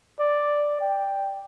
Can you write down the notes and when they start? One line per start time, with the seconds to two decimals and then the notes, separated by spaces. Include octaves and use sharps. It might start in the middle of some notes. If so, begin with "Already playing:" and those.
0.20 D5
0.81 G5